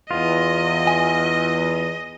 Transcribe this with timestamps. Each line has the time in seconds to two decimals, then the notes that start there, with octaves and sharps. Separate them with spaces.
0.11 E2 F4 D#5
0.87 G#5